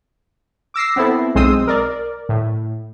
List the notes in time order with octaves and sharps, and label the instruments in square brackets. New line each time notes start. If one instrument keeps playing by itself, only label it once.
[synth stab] D6 E6 A#6 C7
B3 C4 E4 A4
B1 G#3 C4 C6 D#6 E6
A#4 D5
A2